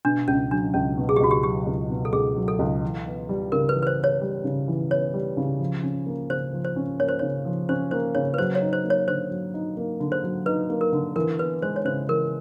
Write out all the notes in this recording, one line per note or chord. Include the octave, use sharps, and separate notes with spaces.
B2 D4
C#2 C#4
F#3 D4
C#2 C#4
B2
G#4
G4
C#2 F#4
G4
F#3 G4
C#2
B2
A4
C#2 G#4
F#3
A4
C#2
E3
B3
G3
C#3 A#4
B4
E3
B4
C5
B3
C#5
G3
C#3
E3
B3 C#5
G3
C#3
F3
C#4
A#3
C#3 C5
F3
C5
C#4
A#3 C#5
C5
C#3 C#5
F3
C#4 C5
A#3 C5
C#3 C#5
B4
F#3 C5
C#5
D#4
C5
A#3
C#5
D3 C5
F#3
D#4
A#3
D3
C5
F#3
D#4 B4
A#3
A#4
D3
E3 A#4
B3 B4
G#3 C5
C#5
C#3 C5
E3 A#4